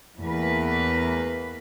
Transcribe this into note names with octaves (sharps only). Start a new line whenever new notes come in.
E2 A3 A#3 B4